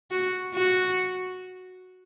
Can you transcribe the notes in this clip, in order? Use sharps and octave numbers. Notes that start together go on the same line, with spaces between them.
F#4
F#4